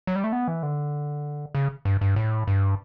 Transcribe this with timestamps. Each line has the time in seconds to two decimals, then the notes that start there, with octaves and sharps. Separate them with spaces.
0.07 F#3
0.16 G3
0.24 A3
0.33 B3
0.48 E3
0.63 D3
1.55 C#3
1.85 G2
2.01 G2
2.16 A2
2.47 G2